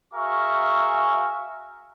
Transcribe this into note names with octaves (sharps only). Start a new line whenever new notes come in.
F#4 G#4 A#4 E5 F5 C#6